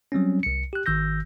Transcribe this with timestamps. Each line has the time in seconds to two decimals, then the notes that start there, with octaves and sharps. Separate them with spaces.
0.12 F#3 G3 C4 C#4
0.43 C2 C#7
0.73 G4 F#6
0.86 G#1 D#3 E6 G6 A#6